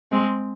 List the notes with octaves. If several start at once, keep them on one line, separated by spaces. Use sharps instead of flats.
G#3 C4